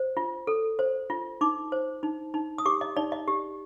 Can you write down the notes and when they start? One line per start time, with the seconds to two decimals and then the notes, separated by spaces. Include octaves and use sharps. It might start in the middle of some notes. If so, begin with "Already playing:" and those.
Already playing: C5
0.17 F4
0.47 A4
0.79 C5
1.10 F4
1.41 D#4 D6
1.72 C5
2.03 D#4
2.34 D#4
2.58 D#6
2.66 G4 D6
2.81 D#5
2.97 D#4 D5
3.12 D#5
3.28 G4